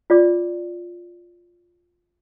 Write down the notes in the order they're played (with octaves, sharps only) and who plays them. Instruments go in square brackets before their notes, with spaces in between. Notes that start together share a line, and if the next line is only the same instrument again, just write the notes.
[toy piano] F4 D5 D6